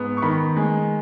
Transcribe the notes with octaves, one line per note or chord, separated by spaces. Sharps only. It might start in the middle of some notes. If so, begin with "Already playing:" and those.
Already playing: G#2 B3
C#6
D#3 B5
G#3